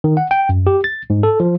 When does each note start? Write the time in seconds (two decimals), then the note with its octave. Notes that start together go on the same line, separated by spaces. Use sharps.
0.04 D#3
0.17 F#5
0.31 G5
0.49 F#2
0.67 G4
0.84 A6
1.10 G#2
1.23 A4
1.40 F3